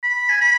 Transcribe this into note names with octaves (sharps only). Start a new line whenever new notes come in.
B5
G#5
B5